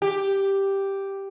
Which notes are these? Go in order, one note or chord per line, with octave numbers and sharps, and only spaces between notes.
G4